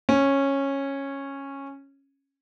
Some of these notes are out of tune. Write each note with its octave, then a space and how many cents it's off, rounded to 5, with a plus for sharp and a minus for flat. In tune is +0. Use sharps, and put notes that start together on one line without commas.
C#4 -10